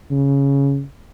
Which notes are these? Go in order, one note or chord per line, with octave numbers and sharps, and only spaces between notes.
C#3